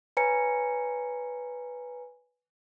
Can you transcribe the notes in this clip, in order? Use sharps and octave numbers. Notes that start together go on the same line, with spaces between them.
B4 C#5 G#5 A#5 C#7